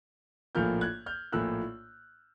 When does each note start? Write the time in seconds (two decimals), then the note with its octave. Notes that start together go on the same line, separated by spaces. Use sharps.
0.55 A#1 A2 F3 A#3 F6 G6
0.81 F#6 G#6
1.06 F6 G6
1.32 A#1 A2 F3 A#3 E6 F#6